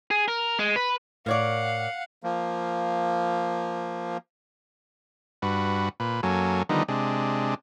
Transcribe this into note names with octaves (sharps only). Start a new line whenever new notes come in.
G#4
A#4
G#3
B4
A2 A#4 C#5 D5 F5 F#5
F3 A#3
G2 F#4 B4
A#2 B4
F#2 F#3 A#3 A4 G#5
D3 D#3 F3 G3 B3 D#4
C3 G#3 D4